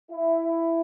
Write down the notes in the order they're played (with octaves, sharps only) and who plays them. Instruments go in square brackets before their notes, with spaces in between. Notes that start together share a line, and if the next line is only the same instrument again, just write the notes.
[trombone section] E4